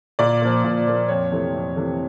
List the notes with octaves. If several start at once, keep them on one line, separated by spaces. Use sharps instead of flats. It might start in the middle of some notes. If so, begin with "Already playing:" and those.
A#2 D5
F3 A#3
A#2
F3 A#3
F2 C#5
C3 E3 A3
F2
C3 E3 A3